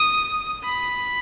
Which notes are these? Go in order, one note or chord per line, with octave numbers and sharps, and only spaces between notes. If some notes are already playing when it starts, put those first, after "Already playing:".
Already playing: D#6
B5